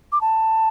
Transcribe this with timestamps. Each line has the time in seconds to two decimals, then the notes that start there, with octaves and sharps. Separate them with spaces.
0.12 D6
0.21 A5